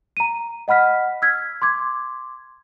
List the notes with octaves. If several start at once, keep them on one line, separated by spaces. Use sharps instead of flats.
A#5 D#7
D#5 F#5 B5 F6 B6
E6 F6 G#6 B6
C6 D6 G#6